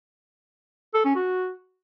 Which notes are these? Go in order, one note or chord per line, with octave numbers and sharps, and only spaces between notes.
A4
C#4
F#4